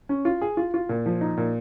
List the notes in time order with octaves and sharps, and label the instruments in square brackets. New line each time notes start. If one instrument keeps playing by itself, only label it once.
[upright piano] C#4
F4
G#4
F4
F4
A#2
F3
D#4
A#2